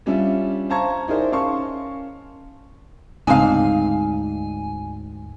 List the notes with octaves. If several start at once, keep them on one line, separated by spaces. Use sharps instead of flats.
G3 C#4 D4 F4 E5
C5 F5 A5 A#5 C#6 G#6
D#4 E4 G#4 A#4 C5 D5
C#4 A#4 F5 A5 C6 C#6
D2 G#2 C#3 C4 D4 D#4 F5 G#5